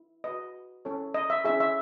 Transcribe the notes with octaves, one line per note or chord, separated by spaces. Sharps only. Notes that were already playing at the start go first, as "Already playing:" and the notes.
Already playing: E4
F#4 B4 D#5
C#4 E4 A4 C#5
D#5
E5
C#4 E4 G#4 E5
E5